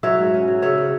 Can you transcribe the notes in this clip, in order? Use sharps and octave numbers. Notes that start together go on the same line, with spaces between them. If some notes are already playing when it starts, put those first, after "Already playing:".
F#3 C#5 E5
G#2
C#4
F#3
C#3 C#5 E5
C#3